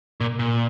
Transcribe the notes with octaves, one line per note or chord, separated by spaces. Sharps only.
A#2
A#2